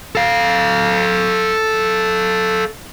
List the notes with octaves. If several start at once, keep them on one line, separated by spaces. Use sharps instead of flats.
A4 F5